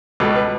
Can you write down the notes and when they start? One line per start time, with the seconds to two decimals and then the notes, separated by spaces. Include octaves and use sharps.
0.20 C#2 B2 A4
0.36 B4